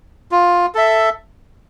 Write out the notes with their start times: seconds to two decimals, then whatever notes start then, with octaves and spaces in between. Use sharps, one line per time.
0.32 F4
0.75 A4 E5